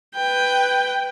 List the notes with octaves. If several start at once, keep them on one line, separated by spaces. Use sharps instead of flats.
B4 G5